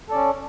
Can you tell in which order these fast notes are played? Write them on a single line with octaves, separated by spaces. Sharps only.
A4 D5 C#4